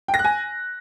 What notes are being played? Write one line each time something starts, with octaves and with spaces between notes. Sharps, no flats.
G5
A#6
F#6
G#5